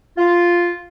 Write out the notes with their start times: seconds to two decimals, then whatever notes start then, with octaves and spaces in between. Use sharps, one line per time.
0.17 F4